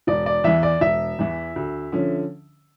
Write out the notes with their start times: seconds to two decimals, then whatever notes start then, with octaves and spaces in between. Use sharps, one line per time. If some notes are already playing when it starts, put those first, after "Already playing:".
0.07 E1 D5
0.26 D5
0.44 E2 E3 E5
0.63 D5
0.81 E1 E5
1.19 E2 E3
1.56 D2
1.92 D3 F3 C#4